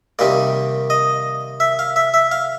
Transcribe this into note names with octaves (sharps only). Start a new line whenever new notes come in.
C3 D#3 G3 A#3 D5
D#5
E5
F5
E5
E5
F5